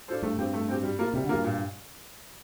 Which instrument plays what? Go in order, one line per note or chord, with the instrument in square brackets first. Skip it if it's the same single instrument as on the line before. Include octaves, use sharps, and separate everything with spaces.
[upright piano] D4 F4 A4 C5
[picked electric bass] G2 [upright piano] A3
[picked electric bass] G2 [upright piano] C4 G4
[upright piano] A3
C4 G4
G3
A#3 F4
[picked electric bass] C3 [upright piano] G3
[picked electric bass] D3
[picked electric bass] G2 [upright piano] A#3 F4
[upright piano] A#2